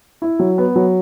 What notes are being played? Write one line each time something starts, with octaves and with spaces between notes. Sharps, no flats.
E4
F#3
B3
F#3